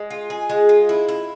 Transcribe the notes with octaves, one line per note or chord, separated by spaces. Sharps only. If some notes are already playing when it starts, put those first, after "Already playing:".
Already playing: G#3
F4
G#4
G#3
F4
E4
E4